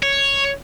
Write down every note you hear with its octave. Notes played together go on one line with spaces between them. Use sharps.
C#5